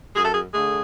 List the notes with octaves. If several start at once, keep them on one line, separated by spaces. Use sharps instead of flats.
F#2 G#4
A4
G#4
D3 A3 G#4